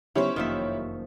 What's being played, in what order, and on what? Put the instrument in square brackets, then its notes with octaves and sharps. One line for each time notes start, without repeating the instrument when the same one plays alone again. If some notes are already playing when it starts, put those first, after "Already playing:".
[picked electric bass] C#3 F#3 B3 [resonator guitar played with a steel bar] C#4 C5 [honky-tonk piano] E4 G4 C#5
[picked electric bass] F1 F#2 A#3 [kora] D#3 F3 E5